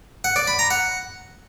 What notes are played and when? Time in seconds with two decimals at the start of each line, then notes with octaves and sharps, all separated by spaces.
0.24 F#5
0.36 D5
0.47 B5
0.59 A#5
0.70 F#5